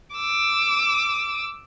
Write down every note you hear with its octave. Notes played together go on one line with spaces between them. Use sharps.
D6 E6